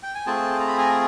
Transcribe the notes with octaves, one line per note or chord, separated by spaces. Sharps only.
G5
G#5
A3 C4 F4 G#4 G5 A5
A#5
B5
G#5 A#5